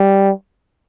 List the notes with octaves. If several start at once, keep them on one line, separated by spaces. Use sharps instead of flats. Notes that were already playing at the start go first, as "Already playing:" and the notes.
Already playing: G3